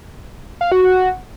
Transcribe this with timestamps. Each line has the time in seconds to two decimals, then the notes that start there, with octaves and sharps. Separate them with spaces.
0.61 F5
0.72 F#4
0.82 F#4